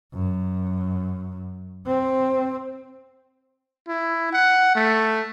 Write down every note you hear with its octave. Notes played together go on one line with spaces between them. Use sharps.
F#2
C4
E4
F#5
A3